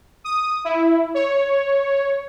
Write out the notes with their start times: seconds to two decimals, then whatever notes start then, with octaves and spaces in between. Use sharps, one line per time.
0.24 D#6
0.65 E4
1.14 C#5